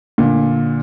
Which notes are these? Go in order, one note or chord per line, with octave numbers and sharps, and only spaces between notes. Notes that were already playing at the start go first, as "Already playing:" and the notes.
A#2 D3